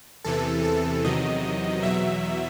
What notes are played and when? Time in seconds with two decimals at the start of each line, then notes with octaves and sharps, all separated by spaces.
0.24 E2 C3 E3 A4
0.64 A4
1.04 E2 C3 D#3 F#3 D#5
1.83 E2 B2 F#3 E5